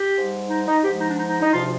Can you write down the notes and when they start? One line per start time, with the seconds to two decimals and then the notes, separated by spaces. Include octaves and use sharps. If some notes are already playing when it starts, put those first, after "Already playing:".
Already playing: G4
0.15 G#2 G3
0.49 D#4
0.66 D#4
0.83 G#2 F3 G#3 G4
1.00 D#4
1.09 D4
1.19 D#4
1.29 D#4
1.41 D#4
1.52 D2 C3 F3 F4